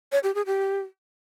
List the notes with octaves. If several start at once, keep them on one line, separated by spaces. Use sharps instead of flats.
C#5
G4
G#4
G4